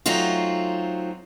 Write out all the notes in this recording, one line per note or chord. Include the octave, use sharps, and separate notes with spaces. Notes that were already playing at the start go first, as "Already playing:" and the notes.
F#3 A3 C4 D#4 F4